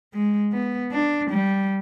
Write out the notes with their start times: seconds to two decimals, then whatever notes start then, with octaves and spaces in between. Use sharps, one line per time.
0.14 G#3
0.52 B3
0.92 D4
1.30 G3